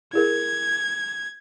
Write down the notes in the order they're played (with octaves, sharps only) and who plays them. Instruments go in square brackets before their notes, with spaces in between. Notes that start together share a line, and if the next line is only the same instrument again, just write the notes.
[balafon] E4 G#4 A#4 [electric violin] G#6